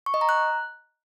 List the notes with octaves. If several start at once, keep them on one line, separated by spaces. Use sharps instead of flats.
C#6
D#5
A#5
F#6